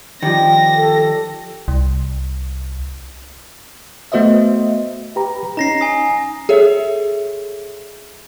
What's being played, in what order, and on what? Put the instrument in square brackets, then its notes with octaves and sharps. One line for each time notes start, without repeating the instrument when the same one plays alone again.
[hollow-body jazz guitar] D#3 F3 [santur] G3 G4 [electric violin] A#6
[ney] A4
[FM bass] C2
[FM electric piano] A3 B3 F#4 C5 D#5 E5
[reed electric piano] G4 B4 A#5
[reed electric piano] C#4 D#4 [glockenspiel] A#5 A#6 C7
[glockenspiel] G#5 D#6
[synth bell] G#4 A4 C#5 E5